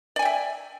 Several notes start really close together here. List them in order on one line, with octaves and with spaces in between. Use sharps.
D5 G#5 G5 E5